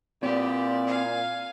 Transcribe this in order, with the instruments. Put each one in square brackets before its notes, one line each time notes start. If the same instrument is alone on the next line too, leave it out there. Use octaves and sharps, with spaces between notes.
[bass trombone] A#2 [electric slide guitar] C4 B4 [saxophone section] E4 F4 D5 [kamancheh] G4
[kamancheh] F5 G#5